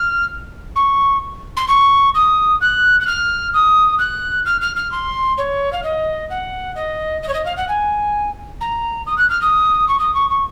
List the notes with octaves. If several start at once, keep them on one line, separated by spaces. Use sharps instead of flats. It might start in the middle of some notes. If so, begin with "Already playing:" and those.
Already playing: F6
C#6
C6
C#6
D#6
F#6
F#6
F6
D#6
F#6
F6
F6
F6
C6
C#5
F5
D#5
F#5
D#5
D#5
C#5
D#5
F5
F#5
G#5
A#5
D#6
F#6
F6
D#6
C#6
D#6
C#6
C#6